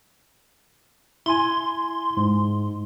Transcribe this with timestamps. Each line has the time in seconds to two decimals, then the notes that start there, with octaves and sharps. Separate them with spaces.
1.26 E4 G#5 C6
2.17 G#2